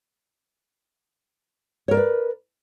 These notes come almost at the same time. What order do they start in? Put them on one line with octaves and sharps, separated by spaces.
C#5 A#4 D5 B4